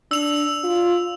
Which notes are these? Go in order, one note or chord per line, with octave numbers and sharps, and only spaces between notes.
D4 E6 F7
F4